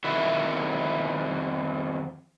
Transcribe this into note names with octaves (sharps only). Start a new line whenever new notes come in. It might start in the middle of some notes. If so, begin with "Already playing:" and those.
F2 D#3 E4 F#4 E5